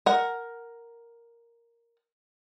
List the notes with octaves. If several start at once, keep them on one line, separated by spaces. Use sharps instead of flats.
A#4 F#5